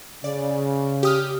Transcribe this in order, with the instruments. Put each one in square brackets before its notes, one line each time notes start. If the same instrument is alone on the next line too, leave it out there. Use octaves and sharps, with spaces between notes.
[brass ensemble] C#3 [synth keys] D5
[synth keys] G4 D#6 F6